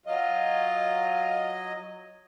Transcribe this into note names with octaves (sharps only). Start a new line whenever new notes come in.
F#3 F4 D#5